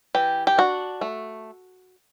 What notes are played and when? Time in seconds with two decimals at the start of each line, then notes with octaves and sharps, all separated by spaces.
0.15 E3 G4
0.47 G4
0.58 D4 F#4
1.01 A3